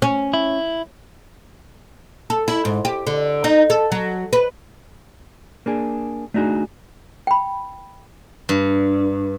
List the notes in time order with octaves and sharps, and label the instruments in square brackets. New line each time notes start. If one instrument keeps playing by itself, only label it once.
[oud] C#4
[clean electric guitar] E4
[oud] A4
E4
G#2
G4
D3
D#4
A4
F#3
B4
[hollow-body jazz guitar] A#3 D4 G#4
A3 D4 D#4 F#4 G#4
[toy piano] G5 B5
[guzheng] G2